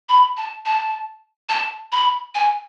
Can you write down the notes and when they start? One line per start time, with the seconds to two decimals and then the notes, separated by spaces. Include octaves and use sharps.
0.09 B5
0.37 A5
0.66 A5
1.49 A5
1.92 B5
2.35 G#5